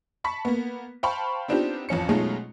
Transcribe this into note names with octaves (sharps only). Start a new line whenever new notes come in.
A5 B5 C#6 B6
A#3 B3
C5 F5 G5 A5 B5 C#6
B3 C4 D4 D#4 F4 G4
A1 F2 C#4 C#7
B2 F#3 G#3 A3 D#4 F4